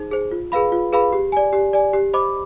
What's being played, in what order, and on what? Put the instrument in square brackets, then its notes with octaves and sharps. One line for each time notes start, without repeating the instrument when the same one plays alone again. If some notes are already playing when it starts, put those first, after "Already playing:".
Already playing: [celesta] D#4 G#4 C5
G#4 C5
F4
G#4 B4 F5 B5
F4
G#4 B4 F5 B5
G4
D5 G#5
G4
D5 G#5
G4
C5 D#5 B5 D6